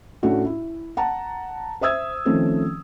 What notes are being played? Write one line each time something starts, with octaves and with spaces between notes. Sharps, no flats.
A2 A3 C#4 D4 F#4
E4
F#5 A5 A#5
C5 E5 D#6 E6 G#6
D#3 F3 A3 C4 C#4